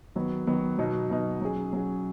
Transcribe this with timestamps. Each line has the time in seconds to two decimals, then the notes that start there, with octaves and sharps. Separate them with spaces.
0.16 D#3 F#3 B3
0.47 D#3 F#3 B3
0.78 B2 F#3 D#4
1.10 B2 F#3 D#4
1.41 F#3 C#4 G#4
1.73 F#3 C#4 G#4